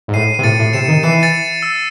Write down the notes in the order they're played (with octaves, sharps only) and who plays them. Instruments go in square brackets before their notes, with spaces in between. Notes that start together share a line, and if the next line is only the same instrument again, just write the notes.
[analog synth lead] G#2
[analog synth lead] A2 [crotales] C7 D#7
[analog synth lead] C3 [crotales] D#7
[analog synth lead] A2 [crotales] A6 C#7
[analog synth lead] A2
[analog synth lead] C3 [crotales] C#7 E7
[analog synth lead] D#3
[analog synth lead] E3 [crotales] C7 D#7
[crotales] A6 C#7
E6